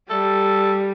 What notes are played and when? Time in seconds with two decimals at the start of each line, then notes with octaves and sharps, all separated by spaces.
0.10 G3 A4